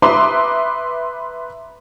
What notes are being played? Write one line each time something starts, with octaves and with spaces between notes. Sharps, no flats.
B4 E5 A#5 C6 D6 D#6